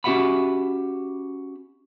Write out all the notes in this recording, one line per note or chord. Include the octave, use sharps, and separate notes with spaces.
C#4 F#4 G4 E5 F#5 B5